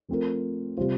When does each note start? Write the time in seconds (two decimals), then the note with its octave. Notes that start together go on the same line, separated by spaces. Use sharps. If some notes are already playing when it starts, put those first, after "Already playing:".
0.09 F3 A3 C4 F4 A#4
0.77 C3 G3 C4 F4 C5